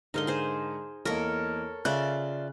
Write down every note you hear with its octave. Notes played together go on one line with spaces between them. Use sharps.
G#2 D3 D#4 A#4 F5 C6
G#4 C5
E2 A#3 A4 A#4 C#5 D#5
C#3 F4 D5 E5 F#6